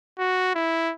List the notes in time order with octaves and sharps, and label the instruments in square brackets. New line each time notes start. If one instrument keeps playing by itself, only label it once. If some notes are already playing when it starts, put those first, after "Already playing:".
[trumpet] F#4
E4